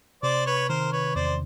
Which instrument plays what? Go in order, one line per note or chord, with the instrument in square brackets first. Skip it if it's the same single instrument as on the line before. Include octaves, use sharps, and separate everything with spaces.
[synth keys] C3 [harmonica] C5 D5
[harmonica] B4 C#5
[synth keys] D#3 [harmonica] A#4 C5
[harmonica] B4 C#5
[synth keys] E2 [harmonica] C5 D5